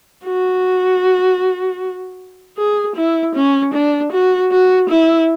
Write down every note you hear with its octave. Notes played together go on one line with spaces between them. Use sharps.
F#4
G#4
E4
C#4
D4
F#4
F#4
E4